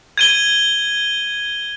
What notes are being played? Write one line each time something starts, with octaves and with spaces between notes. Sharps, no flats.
G#6 D#7 G7